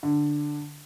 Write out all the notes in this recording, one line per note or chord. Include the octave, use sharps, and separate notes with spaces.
D3